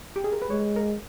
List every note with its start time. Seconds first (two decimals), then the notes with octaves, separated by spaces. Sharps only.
0.16 G4
0.24 G#4
0.33 A#4
0.42 B4
0.50 G#3 C#5
0.76 A#4